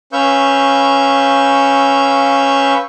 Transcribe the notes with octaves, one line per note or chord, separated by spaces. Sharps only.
C#4 B4 F5 C#6 E6 G6